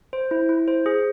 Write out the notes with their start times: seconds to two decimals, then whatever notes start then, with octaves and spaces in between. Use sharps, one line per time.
0.13 C5
0.31 E4
0.49 E4
0.68 C5
0.86 G#4